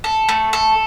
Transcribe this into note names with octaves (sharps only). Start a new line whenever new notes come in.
A4
A3
A4